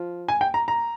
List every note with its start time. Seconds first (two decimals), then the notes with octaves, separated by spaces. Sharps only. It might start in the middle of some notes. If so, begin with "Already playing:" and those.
Already playing: F3
0.29 G#5
0.41 G5
0.54 A#5
0.68 A#5